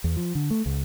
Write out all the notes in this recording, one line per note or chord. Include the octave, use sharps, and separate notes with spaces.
E2
F3
D3
A3
C#2